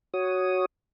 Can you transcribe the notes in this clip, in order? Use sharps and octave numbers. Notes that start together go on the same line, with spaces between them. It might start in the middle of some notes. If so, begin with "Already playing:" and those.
F#4 C#5 D#6